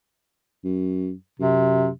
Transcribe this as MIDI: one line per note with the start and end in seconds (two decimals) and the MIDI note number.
0.64 1.12 42
1.39 1.89 42
1.39 1.89 48